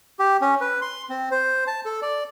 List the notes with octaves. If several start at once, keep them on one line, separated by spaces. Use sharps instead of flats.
G4
C#4
B4
C6
C4
C5
A5
A4
D5